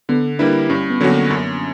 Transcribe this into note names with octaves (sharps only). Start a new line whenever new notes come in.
D3 B3
G3 A#3 D4 E4 B4
G2 C#4
B3
D3 F#3 C#4 F#4
A#3
F#2